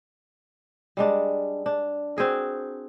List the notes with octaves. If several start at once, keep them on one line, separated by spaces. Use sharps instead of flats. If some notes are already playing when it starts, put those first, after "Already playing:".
G3 G#3 D4
D4
C4 F#4 G#4 A#4